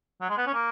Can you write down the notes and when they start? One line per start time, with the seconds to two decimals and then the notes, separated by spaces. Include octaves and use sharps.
0.21 F#3
0.29 G#3
0.38 B3
0.46 C#4
0.54 A#3